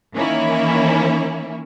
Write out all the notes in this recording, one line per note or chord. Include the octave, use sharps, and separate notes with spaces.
D#3 E3 A#3 C#4 E4